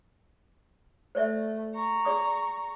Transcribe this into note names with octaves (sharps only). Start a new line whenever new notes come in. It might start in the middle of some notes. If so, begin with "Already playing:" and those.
A3 C5 D5 E5
A#5 C#6
G#4 D5 D#6